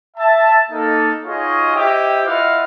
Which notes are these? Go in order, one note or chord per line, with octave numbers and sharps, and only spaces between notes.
E5 A5
A#3 D#4 A4
D#4 F4 F#4 G#4 C#5 D#5
E4 G4 C5 D#5 G5 D6
E4 F4 B4 D#5 F5 F#5